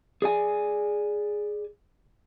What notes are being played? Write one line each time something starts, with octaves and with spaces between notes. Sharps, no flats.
G#4 D5 G#5